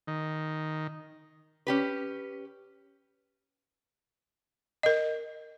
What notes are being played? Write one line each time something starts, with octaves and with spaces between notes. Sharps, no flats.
D#3
C#4 G4 B4
A#4 D#5